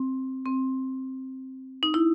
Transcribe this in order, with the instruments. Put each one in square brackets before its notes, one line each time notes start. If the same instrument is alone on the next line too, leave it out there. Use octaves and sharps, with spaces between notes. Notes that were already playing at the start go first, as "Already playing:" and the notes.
Already playing: [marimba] C4
C4
D#4
E4